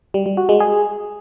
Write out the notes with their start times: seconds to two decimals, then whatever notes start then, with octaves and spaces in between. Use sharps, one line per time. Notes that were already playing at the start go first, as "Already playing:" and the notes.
0.14 G3
0.26 G3
0.37 F#4
0.49 G#3
0.60 G#4